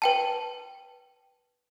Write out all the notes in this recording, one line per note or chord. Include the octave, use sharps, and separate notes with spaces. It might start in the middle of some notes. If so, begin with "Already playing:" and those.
B4 G5 A5